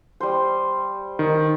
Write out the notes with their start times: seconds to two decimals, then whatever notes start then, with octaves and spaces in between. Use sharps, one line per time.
0.20 G3 C5
1.19 D#3